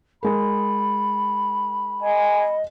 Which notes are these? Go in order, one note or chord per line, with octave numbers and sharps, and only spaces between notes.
G#3 A#4 B5
D#5 G#5